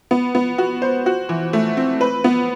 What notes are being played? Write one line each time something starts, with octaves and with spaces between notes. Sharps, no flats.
B3
B3
F#4
C5
F#4
E3
A3
C4
B4
B3